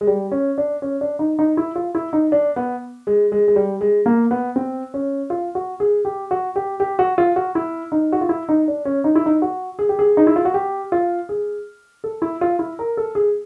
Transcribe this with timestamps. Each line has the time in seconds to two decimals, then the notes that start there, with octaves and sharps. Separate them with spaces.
0.01 G#3
0.07 G3
0.32 C#4
0.58 D4
0.82 C#4
1.01 D4
1.19 D#4
1.39 D#4
1.57 E4
1.76 F4
1.95 E4
2.13 D#4
2.32 D4
2.56 B3
3.07 G#3
3.32 G#3
3.48 G#3
3.56 G3
3.81 G#3
4.06 A#3
4.31 B3
4.56 C4
4.94 C#4
5.30 F4
5.55 F#4
5.80 G#4
6.05 G4
6.31 F#4
6.56 G4
6.80 G4
6.99 F#4
7.18 F4
7.36 F#4
7.55 E4
7.92 D#4
8.12 F#4
8.21 F4
8.29 E4
8.49 D#4
8.68 D4
8.85 C#4
9.04 D#4
9.16 E4
9.26 D#4
9.42 F#4
9.79 G#4
9.89 G4
9.99 G#4
10.17 D#4
10.27 E4
10.36 F4
10.45 F#4
10.54 G4
10.92 F4
11.29 G#4
12.04 A4
12.22 E4
12.41 F4
12.59 E4
12.79 A#4
12.97 A4
13.15 G#4